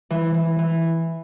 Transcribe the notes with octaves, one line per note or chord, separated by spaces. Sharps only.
E3
E3
E3